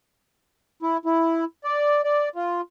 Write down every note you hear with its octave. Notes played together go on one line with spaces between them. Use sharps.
E4
E4
D5
D5
F4